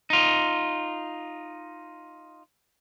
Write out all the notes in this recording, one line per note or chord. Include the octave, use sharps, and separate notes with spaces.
D#4 F4